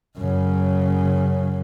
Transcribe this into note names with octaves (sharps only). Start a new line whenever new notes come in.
F#2 C#3